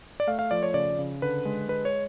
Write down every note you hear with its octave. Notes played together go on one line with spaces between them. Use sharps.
D5
A3 F5
F5
F3 D5
C#5
C#3 D5
C#3
D3 B4
G#3
G#3 B4
C#5